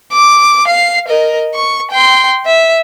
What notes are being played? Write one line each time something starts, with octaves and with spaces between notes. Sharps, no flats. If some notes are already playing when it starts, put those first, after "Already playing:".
D6
F5 C7
A#4 D#5
C#6
G5 C6
E5